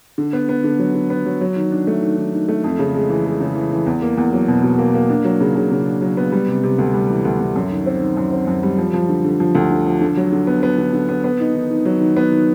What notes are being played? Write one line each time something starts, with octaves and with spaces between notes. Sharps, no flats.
D3
B3
B3
D3
F#3
D3
B3
F#3
F#3
D#3
D4
A3
D#3
D#3
D#3
A3
F2
C#3
G#3
E3
G#3
C#3
E3
E3
E2
A#3
E2
F#3
B2
B2
A#3
A#3
D4
F#3
C#3
C#3
C#3
D4
F#3
B3
G3
C3
C3
D2
G3
E3
D2
D2
F#2
D#3
C4
D#3
F#2
C4
F#2
G3
F3
F3
D3
D3
F3
D2
D3
F3
D3
F#3
D3
B3
B3
D3
D3
B3
B3
D#4
D#3
D#3
F#3
D#3
B3
D#3